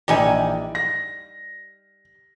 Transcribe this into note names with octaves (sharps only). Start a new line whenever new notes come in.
A#1 E3 G3 D#4 D5 G#5
A#6